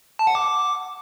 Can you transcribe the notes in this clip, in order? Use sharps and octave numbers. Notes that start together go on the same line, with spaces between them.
A5
F#5
D6